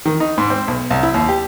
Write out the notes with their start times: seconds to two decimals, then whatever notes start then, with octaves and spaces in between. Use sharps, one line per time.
0.06 D#3
0.20 D#4
0.38 G#2
0.50 C4
0.68 B1
0.90 C2
1.03 E4
1.14 D#2
1.28 G4